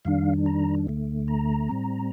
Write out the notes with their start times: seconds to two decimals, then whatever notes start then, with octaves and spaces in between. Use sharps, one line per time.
0.05 F2 D#3 G3 D4 F5
0.46 A#5
0.87 D2 D3 A3
1.28 A#5
1.69 A2 G3 C4